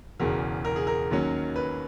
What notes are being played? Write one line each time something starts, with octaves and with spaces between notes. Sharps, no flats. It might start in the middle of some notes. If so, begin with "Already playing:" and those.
E1 E2 C#3 A#4
A#4
G#4
A#4
D#2 D#3 F#3 C#4
B4